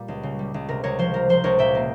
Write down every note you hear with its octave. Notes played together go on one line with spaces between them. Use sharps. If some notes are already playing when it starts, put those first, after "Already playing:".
Already playing: A#2 G3 A#3
C#2
C#3
G3
C#2
C3 A#4
C#2 A#4 C#5
F3 C5
F3 A#4
F3 C5
C#2 A#4 C#5
A#2 E5 G5
A#3